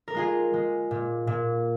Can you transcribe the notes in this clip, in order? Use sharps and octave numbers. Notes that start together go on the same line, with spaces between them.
A#4
G#3 F4 G#4
G#3
A#2
A#2